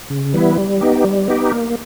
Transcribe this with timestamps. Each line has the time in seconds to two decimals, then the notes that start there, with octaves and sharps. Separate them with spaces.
0.10 C#3
0.34 E3 G3 B3 E4
0.58 G3
0.81 B3 D#4 G4
1.04 G3
1.28 B3 D#4 G4
1.52 A#3